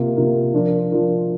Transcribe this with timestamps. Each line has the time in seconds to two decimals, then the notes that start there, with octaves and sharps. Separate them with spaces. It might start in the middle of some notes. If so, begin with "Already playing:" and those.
Already playing: C3 A#3 F4 A#4
0.16 C3 A#3 F4 A#4
0.54 F3 D4 F4 A#4
0.91 F3 D4 F4 A#4